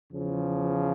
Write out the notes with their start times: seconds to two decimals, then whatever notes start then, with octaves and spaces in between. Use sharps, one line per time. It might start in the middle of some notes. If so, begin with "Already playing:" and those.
0.12 E2 C#3 F3